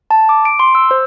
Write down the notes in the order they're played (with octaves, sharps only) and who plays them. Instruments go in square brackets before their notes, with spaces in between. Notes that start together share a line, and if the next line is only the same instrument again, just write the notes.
[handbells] A5
D6
D7
C6
E6
C5